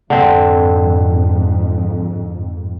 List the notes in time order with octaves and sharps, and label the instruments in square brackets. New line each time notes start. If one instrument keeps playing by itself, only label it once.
[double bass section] F2 G#2 [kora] D3 C4